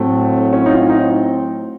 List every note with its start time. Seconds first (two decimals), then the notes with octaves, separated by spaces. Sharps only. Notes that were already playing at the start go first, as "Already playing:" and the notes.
Already playing: A2 F#3 A3 C4
0.53 C#4
0.66 D#4
0.71 F4
0.89 D#4